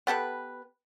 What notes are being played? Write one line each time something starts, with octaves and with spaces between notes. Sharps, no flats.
B3 G4 A4 B4